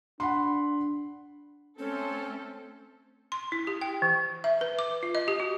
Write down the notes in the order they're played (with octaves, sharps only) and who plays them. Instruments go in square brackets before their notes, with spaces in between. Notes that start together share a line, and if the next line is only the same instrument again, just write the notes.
[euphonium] D4 [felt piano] F#5 B5 C6
[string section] A3 C4 A4 [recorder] C#4
[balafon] C6
E4
G4
G5
E3
E5
B4
D6
F4
D#5
G4
F#4